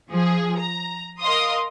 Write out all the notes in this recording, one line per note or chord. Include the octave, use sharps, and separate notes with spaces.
F3 G#4
A#5
A#4 D#5 F5 C6 D#6